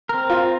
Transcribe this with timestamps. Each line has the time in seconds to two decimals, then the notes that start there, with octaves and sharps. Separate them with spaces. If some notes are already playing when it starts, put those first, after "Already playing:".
0.09 C4 A#4
0.30 F4